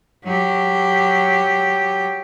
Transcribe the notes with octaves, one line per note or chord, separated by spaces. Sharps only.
F#3 G4